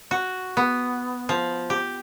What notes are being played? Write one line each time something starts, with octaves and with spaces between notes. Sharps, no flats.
F#4
B3
F3
G4